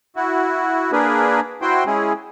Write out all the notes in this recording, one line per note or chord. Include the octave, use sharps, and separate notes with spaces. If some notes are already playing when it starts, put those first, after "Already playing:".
E4 F#4
A#3 D4 G#4 A#4 B4
E4 F#4 C5 G5 C6
G#3 C#4 E4 G#4